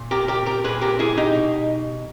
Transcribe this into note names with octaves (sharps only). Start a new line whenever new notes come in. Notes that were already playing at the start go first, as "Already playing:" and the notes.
Already playing: A#2
G4 A#4
G4 A#4
G4 A#4
A#2 G#4 B4
G4 A#4
E4 G#4
D#4 G4
B2